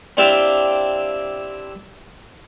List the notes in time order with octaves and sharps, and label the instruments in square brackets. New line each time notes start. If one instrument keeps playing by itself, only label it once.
[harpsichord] C4 D4 E4 G4 E5 F5